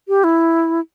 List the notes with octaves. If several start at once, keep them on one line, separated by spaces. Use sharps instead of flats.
G4
E4